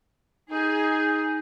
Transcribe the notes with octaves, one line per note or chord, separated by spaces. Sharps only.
D#4 G#4